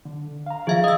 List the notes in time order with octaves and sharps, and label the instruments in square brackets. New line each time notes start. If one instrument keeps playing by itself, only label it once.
[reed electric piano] D3
F5 A#5
[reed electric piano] D#3 F3 G#6 [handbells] G#4 E5 F5
[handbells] D#5 E6 [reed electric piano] D#6